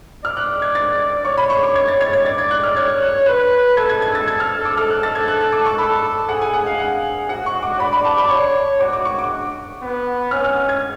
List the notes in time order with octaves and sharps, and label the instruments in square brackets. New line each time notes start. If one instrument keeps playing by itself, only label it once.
[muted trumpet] D5 [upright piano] F6
[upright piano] F#6
G#6
A6
[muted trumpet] C#5 [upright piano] C#6
[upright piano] B5
C#6
D6
G#6
A6
G#6
G#6
[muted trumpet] D5 [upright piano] A6
[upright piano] G#6
F#6
F6
[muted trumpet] C#5 [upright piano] G#6
[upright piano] F#6
[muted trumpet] B4 [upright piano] F#6
[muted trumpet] A4 [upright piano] G#6
[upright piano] G#6
G#6
A6
G#6
F6
D6
[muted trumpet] A4 [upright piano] F6
[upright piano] F#6
A6
G#6
F#6
F#6
D6
C#6
[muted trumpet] A4 [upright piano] B5
[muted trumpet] G#4 [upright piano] F#5
[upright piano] G#5
F#5
F5
F#5
[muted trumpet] F#4 [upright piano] F#5
[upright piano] C#6
D6
[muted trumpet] D5 [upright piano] B5
[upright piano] B5
A5
B5
[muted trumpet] C#5 [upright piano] C#6
[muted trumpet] F#4 [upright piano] D6
[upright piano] D6
C#6
D6
[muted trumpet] B3
[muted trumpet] C#4 [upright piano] F6
[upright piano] F6
G#6